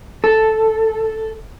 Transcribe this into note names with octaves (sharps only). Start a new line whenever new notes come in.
A4